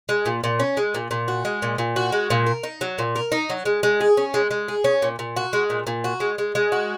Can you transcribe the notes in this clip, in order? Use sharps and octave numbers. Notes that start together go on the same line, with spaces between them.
G#3
A#2
A#2
C#4
G#3
A#2
A#2
F#4
G#3
A#2
A#2
F#4
G#3
A#2
A#4
D#4
F#3
A#2
A#4
D#4
F#3
G#3
G#3
G#4
C#4
G#3
G#3
G#4
C#4
A#2
A#2
F#4
G#3
A#2
A#2
F#4
G#3
G#3
G#3
F#4